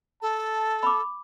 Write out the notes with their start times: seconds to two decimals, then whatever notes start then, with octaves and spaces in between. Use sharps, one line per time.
0.22 A4 A5
0.83 B5 D6